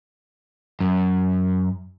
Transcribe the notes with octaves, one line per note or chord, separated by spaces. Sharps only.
F#2